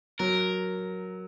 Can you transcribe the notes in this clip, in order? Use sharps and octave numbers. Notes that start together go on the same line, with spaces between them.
F#3 A#4